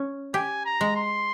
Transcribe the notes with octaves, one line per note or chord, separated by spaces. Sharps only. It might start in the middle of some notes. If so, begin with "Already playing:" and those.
Already playing: C#4
G4 G#5
A#5
G#3
C6